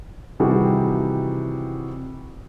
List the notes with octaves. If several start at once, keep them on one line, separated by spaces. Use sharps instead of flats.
C3 D#3 E3 G3 F#4 G#4